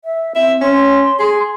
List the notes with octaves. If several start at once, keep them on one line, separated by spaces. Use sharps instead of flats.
E5
C4 E5
C#4 C6
G#4